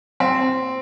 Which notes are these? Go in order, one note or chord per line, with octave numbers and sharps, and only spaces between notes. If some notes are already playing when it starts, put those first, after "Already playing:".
C4